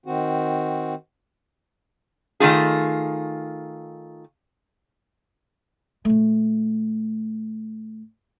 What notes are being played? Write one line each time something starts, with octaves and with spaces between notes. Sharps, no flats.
D#3 C4 F#4
D#3 A3 F4 G#4
A#2 A3